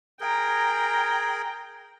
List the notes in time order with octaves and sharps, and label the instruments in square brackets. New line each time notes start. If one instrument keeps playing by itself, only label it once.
[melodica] G#4 A#4 [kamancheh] G5 A#5